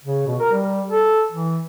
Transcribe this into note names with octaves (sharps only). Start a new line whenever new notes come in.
C#3
B2
A#4
G3
A4
E3